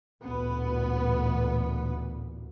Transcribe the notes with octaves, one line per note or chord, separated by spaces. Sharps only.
A1 D2 A#2 B3 B4